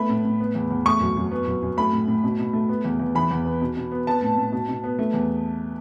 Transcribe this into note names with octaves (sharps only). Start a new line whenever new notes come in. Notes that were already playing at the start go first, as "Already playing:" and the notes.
Already playing: A3 B3 B5
A2
A2
B3
E2
E2
A3 C#6
F#2
F#2
B3
F#2
F#2
A3 B5
A2
A2
B2
B2
A3
B3
E2
E2
E3 B5
E2
B3
B2
B2
B3
B3 A5
A2
A2
B2
B2
B3
A3
E2